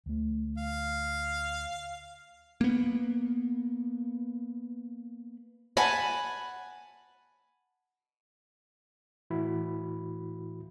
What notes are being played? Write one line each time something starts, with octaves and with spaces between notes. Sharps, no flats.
D2 A3
F5
A#3 B3
F#5 G#5 A5 B5
A2 E3 E4 F#4 B5